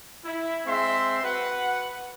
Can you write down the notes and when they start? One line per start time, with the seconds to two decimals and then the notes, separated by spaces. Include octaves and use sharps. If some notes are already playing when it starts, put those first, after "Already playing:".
0.25 E4
0.65 G#3 C4 E5 C6
1.23 F#4 B4 F#5